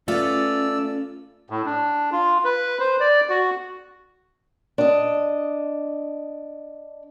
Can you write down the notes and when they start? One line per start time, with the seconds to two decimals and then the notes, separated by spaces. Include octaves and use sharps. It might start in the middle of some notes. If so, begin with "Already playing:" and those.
0.08 A3 C#4 F4 A4 B4 D5 E6
1.50 A2
1.66 D4
2.12 F4
2.45 B4
2.80 C5
3.00 D5
3.29 F#4
4.78 D4 D#5